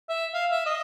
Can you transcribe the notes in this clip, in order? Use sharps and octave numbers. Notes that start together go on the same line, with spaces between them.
E5
F5
E5
D#5